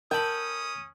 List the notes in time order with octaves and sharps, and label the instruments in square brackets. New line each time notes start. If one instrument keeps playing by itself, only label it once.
[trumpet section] C#4 D#6 [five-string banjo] A4 G5 [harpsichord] A#4 B5